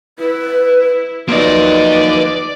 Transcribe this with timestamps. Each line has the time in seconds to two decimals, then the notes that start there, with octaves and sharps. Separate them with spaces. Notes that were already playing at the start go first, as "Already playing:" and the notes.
0.19 E4 B4
1.29 F3 F#3 A#3 D#4 B4 D5 D#5